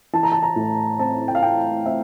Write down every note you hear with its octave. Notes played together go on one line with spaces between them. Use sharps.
E3 A5
A#5
A5
A#5
A2
C4 A5
G5
F5
C4 G5
C4 E5